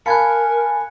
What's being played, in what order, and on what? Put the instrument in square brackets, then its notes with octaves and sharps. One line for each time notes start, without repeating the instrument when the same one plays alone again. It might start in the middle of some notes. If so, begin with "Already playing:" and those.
[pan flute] A#4 [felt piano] F5 A5 B5 [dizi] G#5 [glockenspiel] F#6 G#6 C#7